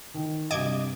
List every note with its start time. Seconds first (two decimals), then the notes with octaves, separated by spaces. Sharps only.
0.14 D#3
0.51 G2 C3 D#5 D6 G#6